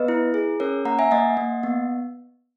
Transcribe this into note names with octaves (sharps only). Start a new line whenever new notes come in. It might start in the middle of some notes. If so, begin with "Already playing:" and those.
Already playing: B3 B4 D#5
E4
G#4
C#4 A#4 C#5
A#3 F#5 A#5
E5 G#5
A#3 D#5 F#5
A#3
B3